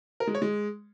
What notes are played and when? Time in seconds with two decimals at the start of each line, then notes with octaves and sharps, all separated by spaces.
0.20 A#4
0.27 G#3
0.35 C#5
0.42 G#3